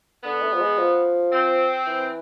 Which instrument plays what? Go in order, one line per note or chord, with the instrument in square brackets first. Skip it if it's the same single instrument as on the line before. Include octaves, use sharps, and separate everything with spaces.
[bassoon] D3 [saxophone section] B3
[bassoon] A3
F3
G#3
F3
[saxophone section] C4
[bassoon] E3